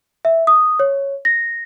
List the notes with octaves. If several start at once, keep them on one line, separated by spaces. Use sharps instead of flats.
E5
D#6
C#5
A#6